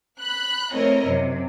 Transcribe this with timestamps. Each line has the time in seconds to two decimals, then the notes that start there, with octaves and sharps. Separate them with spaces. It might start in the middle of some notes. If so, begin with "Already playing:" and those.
0.20 B5 F#6
0.72 A3 C4 E4 A#4 C#5 D#5
1.05 F#2 C3